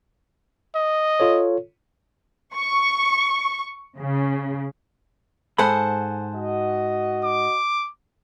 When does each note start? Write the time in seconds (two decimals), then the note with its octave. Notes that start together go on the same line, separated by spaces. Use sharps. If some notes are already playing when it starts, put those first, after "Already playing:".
0.75 D#5
1.20 F4 A4 C#5
2.54 C#6
3.98 C#3
5.58 G#2 G#4 A4 C5 F#5 B5
6.35 F#4 D#5
7.24 D6